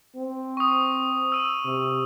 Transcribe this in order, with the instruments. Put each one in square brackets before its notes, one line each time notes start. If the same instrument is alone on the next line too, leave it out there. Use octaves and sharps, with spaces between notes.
[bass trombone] C4
[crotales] C#6 D#6
E6 D#7
[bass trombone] C3